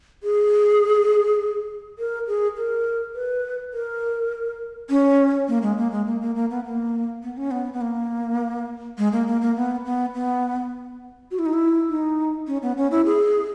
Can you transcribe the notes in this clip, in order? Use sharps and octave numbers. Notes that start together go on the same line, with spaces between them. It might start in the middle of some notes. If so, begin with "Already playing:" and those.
G#4
A#4
G#4
A#4
B4
A#4
C#4
A#3
G#3
A#3
G#3
A#3
A#3
A#3
B3
A#3
B3
C#4
B3
B3
A#3
G#3
A#3
A#3
A#3
B3
B3
B3
F#4
E4
D#4
E4
D#4
C#4
B3
C#4
E4
G#4